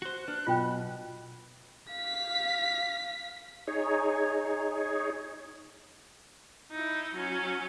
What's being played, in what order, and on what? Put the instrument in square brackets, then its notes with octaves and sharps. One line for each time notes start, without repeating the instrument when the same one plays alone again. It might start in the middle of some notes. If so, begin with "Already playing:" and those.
[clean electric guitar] F#4 C5 [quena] F#6
[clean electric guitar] D4 [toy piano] B4
[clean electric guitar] B1 [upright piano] B2 [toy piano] F4 G5
[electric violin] F5 B6
[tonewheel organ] D#4 G#4 C#5
[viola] D#4 E4
F#3 C#4